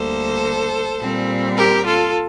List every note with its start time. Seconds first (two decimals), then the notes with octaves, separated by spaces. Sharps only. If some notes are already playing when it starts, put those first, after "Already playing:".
Already playing: D2 D3 G3 A#3 A4 C5
0.99 A#2 G3 C4
1.57 G4 A#4
1.86 F4 A4